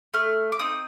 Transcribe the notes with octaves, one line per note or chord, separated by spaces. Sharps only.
A3 F6
D6
C4 D#4 D#6